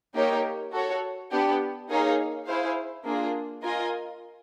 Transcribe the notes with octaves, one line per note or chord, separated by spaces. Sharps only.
A#3 D#4 G4 A#4 C#5
F#4 A4 C#5
B3 D4 G4
A#3 D#4 G#4 C#5 F5
E4 G#4 C5 F5
A#3 D4 F4 G#4
F4 A#4 D#5 G#5